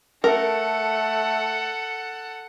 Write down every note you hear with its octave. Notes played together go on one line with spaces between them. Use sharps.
A3 A4 A#4 F#5